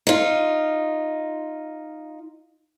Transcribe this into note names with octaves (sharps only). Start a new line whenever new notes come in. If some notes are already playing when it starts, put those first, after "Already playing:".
D#4 F4